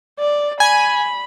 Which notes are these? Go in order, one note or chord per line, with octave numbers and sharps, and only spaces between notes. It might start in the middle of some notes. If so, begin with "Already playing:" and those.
D5
G#5 B5